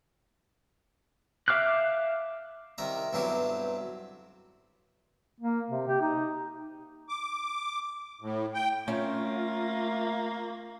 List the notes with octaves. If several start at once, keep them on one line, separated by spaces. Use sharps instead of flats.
E5 F5 D6 F6 F#6
C2 D#3 E5 A#5
B1 G2 F#3 C4 E4 G4
A#3
C3
G4
D#4
D6
A2
G5
A3 A#3 C4 C#4 F4